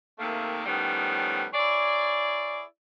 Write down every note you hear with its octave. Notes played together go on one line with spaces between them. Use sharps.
C3 D#3 A3 A#3
A2 D#3 F3 G3 B3 C#4
E4 G#4 C#5 D5